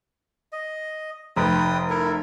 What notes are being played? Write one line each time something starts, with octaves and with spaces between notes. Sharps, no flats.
D#5
F1 B4 G5 D#6
E4 A4 A#4